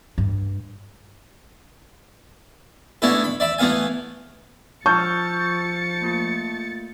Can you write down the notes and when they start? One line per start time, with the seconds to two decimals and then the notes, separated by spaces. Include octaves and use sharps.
0.18 G2
3.02 A3 B3 C#4 D4 E4 A4
3.24 B5
3.40 D5 E5 B5
3.58 E3 A3 B3 F5 G#5
4.86 F3 A5 C#6 E6 F6 G6 A6 C#7
6.01 A3 A#3 F4